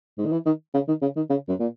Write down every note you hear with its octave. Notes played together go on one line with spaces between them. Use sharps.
G#2
D#3
E3
D#3
C#3
D#3
C#3
D#3
C#3
F#2
A#2